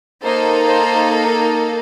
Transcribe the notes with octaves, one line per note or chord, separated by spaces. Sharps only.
A#3 D#4 A4 C5
C5